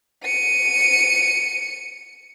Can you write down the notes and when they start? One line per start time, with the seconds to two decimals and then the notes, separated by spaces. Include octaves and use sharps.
0.24 C#7 D#7